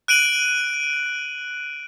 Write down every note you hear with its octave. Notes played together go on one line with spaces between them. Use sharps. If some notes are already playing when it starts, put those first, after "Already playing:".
F#6 D7 D#7 F#7